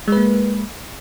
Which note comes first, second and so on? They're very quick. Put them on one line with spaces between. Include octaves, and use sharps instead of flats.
G#3 B4 A#3